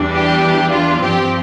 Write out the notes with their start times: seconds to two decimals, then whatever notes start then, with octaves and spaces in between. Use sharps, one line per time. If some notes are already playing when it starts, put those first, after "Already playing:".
Already playing: E2 E3 G3 D4
0.13 G4
0.72 F4
1.01 G2 F3 C4 G4